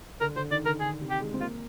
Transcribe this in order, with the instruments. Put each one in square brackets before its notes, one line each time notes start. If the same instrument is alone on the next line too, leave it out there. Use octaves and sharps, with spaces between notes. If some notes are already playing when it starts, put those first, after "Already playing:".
[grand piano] D3 [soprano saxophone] A#4
[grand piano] D3 [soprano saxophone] C5
[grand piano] D#3 [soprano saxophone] D5
[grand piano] D3 [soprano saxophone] A#4
[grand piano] D3 [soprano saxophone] G#4
[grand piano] C3
[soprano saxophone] G4
[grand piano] G#3
C4
[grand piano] A#3 [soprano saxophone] F4